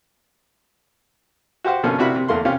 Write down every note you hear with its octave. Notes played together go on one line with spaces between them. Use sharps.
F#4 G4 C5 F#5
B2 D3 F3 A#3 C#4
C3 D4 E4 F#4 A#4 B5
C3
E2 A3 A#3 C6
C3 C#4 F4 G4